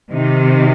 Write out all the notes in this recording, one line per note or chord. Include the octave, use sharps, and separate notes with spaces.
C3 D#3